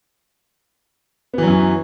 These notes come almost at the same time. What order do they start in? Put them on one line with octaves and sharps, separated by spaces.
B3 E3 F#3 F#2